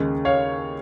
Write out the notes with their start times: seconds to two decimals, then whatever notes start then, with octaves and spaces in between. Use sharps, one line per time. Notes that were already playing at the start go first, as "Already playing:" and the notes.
Already playing: D#2 C#3 G#3
0.25 C#5 F5